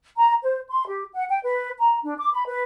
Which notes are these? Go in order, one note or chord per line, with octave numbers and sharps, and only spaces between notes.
A#5
C5
C6
G4
F#5
G5
B4
A#5
D4
D6
B5
B4